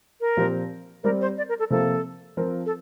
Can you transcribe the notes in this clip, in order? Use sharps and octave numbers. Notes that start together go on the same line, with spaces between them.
A#4
A#2 F3 C4 G4 C5
G3 C4 G4 A#4 D5
C5
D5
A#4
A4
C3 F3 A#3 A4
F3 C4 F4 A#4
A4